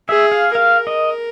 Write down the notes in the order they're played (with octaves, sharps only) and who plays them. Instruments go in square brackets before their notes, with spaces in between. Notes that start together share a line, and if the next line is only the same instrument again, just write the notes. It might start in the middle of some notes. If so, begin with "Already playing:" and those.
[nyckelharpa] G#4 [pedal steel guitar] E5
[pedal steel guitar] F5
[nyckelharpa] A#4 [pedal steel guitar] F5
[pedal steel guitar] D#5